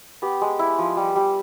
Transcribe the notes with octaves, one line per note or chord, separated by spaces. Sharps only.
B3 G4
G#3
E4
F3
G3
G3